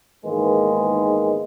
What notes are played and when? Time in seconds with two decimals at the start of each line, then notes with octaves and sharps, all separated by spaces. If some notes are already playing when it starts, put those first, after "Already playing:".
0.25 G#2 D#3 E3 G#3 A#3 B3